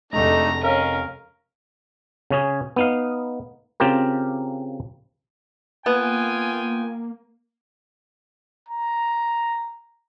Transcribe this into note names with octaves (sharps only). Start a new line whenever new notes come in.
F1 G#3 A3 D4 D#4 A#5
C#4 A#4 F5
C#3 C#4 G#4
B3 D#4 F5
C#3 C4 F4 G4 A#4
A#3 B3 F4 G5 G#5
A#5